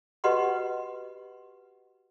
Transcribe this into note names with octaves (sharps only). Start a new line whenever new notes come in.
F#4 G4 B4 D#5 F#5 C6